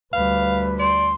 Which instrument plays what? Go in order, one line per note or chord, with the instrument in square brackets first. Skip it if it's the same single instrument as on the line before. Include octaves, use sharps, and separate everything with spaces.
[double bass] D2 G3 [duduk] B4 [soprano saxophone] F5
[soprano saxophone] D5 [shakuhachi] C6